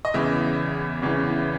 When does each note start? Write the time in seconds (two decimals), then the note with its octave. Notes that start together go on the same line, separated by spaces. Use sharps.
0.05 D#5
0.14 E2 C#3 E3 E5
1.02 E2 C#3 E3